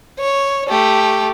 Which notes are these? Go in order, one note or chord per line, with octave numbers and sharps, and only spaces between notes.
C#5
A3 G4